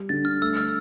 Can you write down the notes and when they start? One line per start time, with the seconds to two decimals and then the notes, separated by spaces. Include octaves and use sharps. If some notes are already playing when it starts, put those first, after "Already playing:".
Already playing: G3
0.09 D3 A6
0.25 F6
0.42 A3 E6
0.57 F6